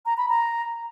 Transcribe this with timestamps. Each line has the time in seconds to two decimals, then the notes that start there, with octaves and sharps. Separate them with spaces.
0.06 A#5
0.17 B5
0.29 A#5